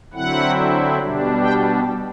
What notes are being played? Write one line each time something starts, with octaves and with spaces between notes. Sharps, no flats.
D3 F#3 C4 E4 F#5
B2 G3 D4
G5